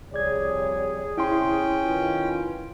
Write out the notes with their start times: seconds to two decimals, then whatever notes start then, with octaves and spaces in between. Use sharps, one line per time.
0.12 C2 F2 G3 G#4 C#5 D5 G#6
1.17 C3 C#4 E4 G5 C6
1.84 D#3 F4 B4